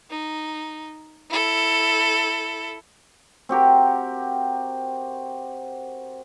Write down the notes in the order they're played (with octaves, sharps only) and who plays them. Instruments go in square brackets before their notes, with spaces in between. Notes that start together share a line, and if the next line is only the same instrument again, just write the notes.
[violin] D#4
E4 A4
[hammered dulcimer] C4 F#4 G4 A#4